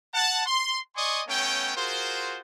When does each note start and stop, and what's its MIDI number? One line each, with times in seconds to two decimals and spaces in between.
0.14 0.44 78
0.14 0.44 81
0.46 0.79 84
0.96 1.21 74
0.96 1.21 75
0.96 1.21 80
0.96 1.21 84
0.96 1.21 85
0.96 1.21 87
1.28 1.75 57
1.28 1.75 59
1.28 1.75 61
1.28 1.75 73
1.28 1.75 79
1.76 2.40 65
1.76 2.40 66
1.76 2.40 68
1.76 2.40 70
1.76 2.40 72